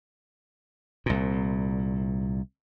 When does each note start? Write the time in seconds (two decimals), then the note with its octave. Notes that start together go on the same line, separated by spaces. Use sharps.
1.06 C2 A#2